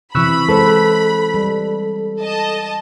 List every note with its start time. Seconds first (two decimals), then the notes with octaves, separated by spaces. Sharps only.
0.15 C3 E3 B5 C#6 E6 F#6
0.49 G#3 A4 B4 C5
1.34 G3
2.21 D#5 A5